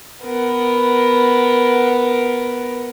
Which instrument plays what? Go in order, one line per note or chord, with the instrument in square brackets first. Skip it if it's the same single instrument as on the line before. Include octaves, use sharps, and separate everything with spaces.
[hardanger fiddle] B3 A#4